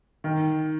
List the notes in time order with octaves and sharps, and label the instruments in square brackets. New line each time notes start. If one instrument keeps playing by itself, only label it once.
[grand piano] D#3